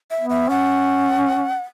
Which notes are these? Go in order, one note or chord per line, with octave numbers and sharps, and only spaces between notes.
E5
B3
E5
C#4 F#5